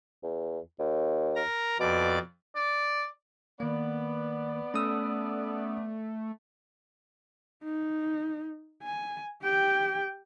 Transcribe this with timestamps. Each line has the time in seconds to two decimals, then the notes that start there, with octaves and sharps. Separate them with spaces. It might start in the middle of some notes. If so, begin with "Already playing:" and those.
0.23 E2
0.79 D#2
1.36 A#4 A#5
1.80 F2 B2 D5 D6
2.56 D5
3.60 D#3 A#3 B3 D5
4.74 A3 C#4 D#6 E6
7.64 D#4
8.83 G#5
9.42 G4 G5